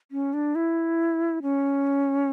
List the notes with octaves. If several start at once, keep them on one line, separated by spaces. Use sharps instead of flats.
C#4
D4
E4
C#4